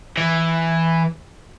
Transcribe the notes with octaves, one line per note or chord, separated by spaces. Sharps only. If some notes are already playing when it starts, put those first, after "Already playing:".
E3